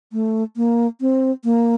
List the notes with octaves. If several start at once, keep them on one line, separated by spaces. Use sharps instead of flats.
A3
A#3
C4
A#3